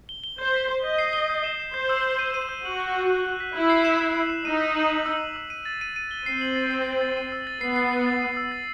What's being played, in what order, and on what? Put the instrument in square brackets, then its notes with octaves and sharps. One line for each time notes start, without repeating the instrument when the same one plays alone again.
[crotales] G7
G7
[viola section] C5 [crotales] G6
[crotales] B6
G6
[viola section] D#5 [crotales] G6
[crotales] C7
G7
G6
E7
E7
[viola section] C5 [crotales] G6
[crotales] E6
C7
D#7
D#7
E6
[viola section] F#4 [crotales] F#7
[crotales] F#6
F#6
F#6
F#6
B6
[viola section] E4 [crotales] E6
[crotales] C7
E7
E7
E6
C7
[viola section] D#4 [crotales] D#7
[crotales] B6
F#7
F#7
E6
F#7
E6
D#7
A6
D#7
D#7
G7
[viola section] C4 [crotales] C7
[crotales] F#7
A6
C7
A6
A6
D#7
E6
A6
[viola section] B3 [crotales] C7
[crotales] C7
A6
A6
D#7
E6
A6